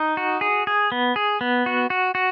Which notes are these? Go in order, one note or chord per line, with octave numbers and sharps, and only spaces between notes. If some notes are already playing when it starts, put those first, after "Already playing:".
Already playing: D#4
F#4
G#4
G#4
B3
G#4
B3
F#4
F#4
F#4